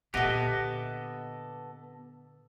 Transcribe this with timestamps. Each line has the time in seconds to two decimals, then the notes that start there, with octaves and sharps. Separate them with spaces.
0.14 A#2 D3 B3 G4 A4 D#5 E5